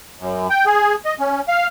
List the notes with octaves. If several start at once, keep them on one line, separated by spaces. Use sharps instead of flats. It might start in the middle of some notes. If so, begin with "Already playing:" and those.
F#2
G5
G#4
D#5
C#4
F5